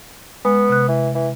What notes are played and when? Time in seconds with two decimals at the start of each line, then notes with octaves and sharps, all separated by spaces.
0.45 G#3 B3
0.69 C3 F#6
0.88 E3
1.15 E3